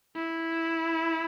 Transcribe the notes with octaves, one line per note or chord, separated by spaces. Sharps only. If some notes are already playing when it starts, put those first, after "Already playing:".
E4